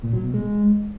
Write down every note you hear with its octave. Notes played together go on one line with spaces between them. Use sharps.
A#2
F#3
B2
G#3